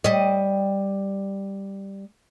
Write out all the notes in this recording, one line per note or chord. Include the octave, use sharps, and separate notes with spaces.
G3 D#5